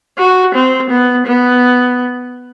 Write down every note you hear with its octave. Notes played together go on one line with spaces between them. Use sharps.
F#4
C4
B3
B3